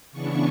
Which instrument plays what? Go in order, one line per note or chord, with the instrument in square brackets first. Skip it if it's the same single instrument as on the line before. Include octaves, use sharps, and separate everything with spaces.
[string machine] C#3 E3 B3 D4 C#6